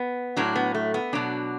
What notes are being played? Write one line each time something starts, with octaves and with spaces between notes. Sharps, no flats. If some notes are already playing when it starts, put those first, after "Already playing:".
Already playing: B3
A2 F#3 D4
B3
A3
B3
B2 F#3 D4